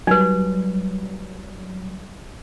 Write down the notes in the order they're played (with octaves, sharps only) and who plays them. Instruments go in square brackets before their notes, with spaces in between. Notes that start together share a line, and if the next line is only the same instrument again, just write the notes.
[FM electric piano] F#3 G3 [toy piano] D#4 B4